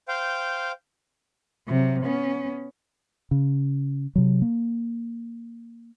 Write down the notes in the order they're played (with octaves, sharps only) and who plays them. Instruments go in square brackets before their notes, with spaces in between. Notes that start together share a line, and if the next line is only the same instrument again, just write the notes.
[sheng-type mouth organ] C5 F5 G5
[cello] C3 F#3
B3 C#4
[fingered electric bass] C#3
C3 F#3
A#3